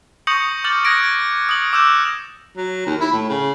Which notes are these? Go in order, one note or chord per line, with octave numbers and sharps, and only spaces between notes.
C#6 D#6 G6 A#6 C#7 F#7
D6 F6 G6 A6 F#7
D#6 F#6 G#6 A#6 D7
D#6 F#7
D6 E6 F#6 G6 E7
F#3
D#2
E4
A2
C#3